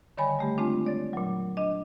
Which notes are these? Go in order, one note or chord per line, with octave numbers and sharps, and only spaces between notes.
D3 D#3 G3 C#5 G#5 B5
G3 A3 G4
G#3 A3 C4 D4 F4
C#5 D5 A6
A#2 F#3
D4 D#5